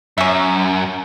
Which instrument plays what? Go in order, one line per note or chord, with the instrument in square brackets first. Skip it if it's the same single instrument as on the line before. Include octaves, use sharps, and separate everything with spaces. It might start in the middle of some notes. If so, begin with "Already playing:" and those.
[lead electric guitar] F#2 [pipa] C#4 E5